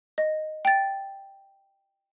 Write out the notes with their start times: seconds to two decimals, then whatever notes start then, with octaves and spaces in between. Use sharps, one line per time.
0.18 D#5
0.65 G5 A6